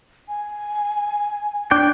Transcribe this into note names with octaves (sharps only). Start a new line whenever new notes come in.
G#5
D4 D5 G5